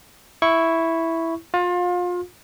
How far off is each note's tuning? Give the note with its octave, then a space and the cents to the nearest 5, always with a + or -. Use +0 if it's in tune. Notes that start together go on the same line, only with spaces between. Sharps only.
E4 +0 C#6 +0
F4 +30 F5 +35